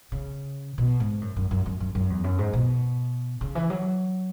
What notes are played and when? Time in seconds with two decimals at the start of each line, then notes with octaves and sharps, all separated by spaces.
0.12 C#3
0.78 B2
1.00 G#2
1.21 F#2
1.36 F#2
1.51 F#2
1.66 F#2
1.80 F#2
1.95 F#2
2.10 E2
2.24 F#2
2.38 G#2
2.53 B2
3.41 C#3
3.55 E3
3.70 F#3